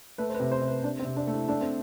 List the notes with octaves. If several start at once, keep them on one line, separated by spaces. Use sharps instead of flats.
A3 B4
C5
B4
C3
C5
C3
B4
C3 D4
C4
C3
D4
A3
E4
A3 D4
C4